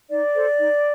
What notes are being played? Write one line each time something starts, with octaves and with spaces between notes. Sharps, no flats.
D#4 D5
A4 C5
D#4